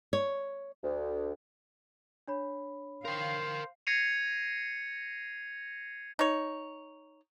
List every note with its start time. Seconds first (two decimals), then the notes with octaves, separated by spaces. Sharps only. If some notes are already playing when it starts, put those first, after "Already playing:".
0.13 C#5
0.83 D2
2.27 D4 C#5 B5
3.05 A#4 C5 F5 G5
3.87 G#6 A#6 C7 C#7 D#7 F7
6.19 D#4 C#5